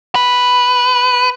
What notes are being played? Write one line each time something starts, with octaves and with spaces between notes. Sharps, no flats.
B4